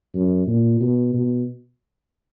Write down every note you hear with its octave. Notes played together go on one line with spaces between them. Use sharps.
F#2
A#2
B2
B2